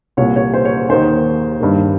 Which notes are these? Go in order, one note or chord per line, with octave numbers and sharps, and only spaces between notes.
C2 A#2 C#5
C#5
C5
C#5
C5
D#2 D#3 C5
G2 D#3